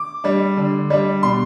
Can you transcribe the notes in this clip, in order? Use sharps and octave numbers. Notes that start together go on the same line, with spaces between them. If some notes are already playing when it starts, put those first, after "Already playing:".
Already playing: D6
G3 D4
D3
G3 D4
B2 C6